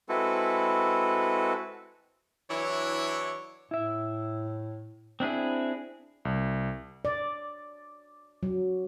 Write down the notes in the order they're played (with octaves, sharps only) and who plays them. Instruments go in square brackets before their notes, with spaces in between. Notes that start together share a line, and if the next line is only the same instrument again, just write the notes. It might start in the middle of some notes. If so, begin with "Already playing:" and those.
[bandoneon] G#3 C4 E4 F#4 A4 B4
[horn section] E3 F#3 D4 E4 C#5
[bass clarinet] A2 [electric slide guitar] E4 E5
[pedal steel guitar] C4 D4 E4 G#4
[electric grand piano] C2
[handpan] D5
F#3